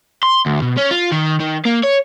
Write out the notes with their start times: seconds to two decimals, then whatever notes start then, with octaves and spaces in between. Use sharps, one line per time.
0.23 C6
0.46 D2
0.62 B2
0.77 C#4
0.91 F4
1.12 D#3
1.40 D#3
1.65 A#3
1.84 C#5